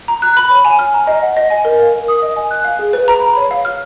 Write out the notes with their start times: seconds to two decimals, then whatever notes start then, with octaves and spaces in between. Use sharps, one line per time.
0.08 A#5
0.22 F#6
0.37 B5
0.51 C#5
0.65 G#5
0.79 F6
0.94 A#5
1.07 D#5
1.22 F#5
1.37 D#5
1.50 G#5
1.65 A#4
1.79 F5
1.94 A#4
2.08 D#6
2.22 D#5
2.36 G#5
2.51 F#6
2.65 F5
2.79 G#4
2.93 B4
3.08 A#5
3.21 B5
3.37 C#5
3.51 F5
3.65 F6